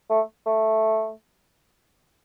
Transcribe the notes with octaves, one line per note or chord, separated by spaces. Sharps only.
A3
A3